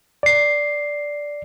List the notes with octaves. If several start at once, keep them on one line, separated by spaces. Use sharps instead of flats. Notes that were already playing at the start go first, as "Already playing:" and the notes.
D5 C7